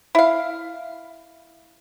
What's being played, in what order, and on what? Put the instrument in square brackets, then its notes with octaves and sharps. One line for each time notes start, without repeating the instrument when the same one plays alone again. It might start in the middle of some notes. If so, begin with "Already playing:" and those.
[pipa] E4 F5